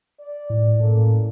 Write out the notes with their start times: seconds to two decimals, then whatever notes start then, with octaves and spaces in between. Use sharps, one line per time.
0.20 D5
0.50 A2
0.80 A2 A#3 C#4 A4